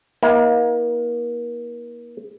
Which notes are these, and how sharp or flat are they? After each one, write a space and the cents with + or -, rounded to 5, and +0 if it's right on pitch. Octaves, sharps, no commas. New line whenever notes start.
A#3 +35 E4 -45